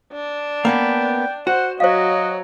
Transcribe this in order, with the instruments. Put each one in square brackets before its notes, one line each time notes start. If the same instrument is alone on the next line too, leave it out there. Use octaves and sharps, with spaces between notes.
[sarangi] D4
[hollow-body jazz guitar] A#3 B3 C#4 [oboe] G5 [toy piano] D6
[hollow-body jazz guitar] F#4 [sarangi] C5 [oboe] F#5
[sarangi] F#3 [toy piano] C5 F5 [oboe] D#5